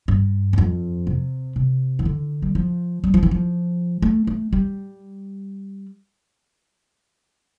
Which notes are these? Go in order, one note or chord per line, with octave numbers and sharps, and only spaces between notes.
G2
E2
F2
C3
C3
E3
D3
G3
F3
G3
F3
E3
F3
A3
A3
G3